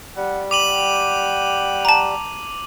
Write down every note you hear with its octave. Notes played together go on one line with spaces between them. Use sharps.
G3 F#5
F#5 G5 D6 D#7 F#7
A5 A#5